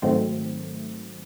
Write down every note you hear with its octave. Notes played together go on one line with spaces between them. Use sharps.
G#2 D#3 F#3 A3 C4